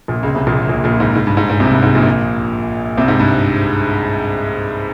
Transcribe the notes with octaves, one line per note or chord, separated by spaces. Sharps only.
A#1 A#2
C#2 C#3
C2 C3
A#1 A#2
A#1 A#2
A#1 A#2
G#2
G#2
G2
G#2
G#2
C2 C3
G2
G#2
A#1 A#2
C2 C3
G#2
G2